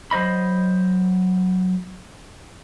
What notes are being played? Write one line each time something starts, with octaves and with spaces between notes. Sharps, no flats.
F#3 C5 D#5 B5